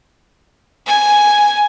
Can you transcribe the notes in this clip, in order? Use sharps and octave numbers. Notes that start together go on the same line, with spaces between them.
G#5